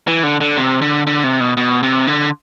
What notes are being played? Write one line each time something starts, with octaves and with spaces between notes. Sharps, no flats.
E3
D3
D3
C3
D3
D3
C3
B2
B2
C3
D3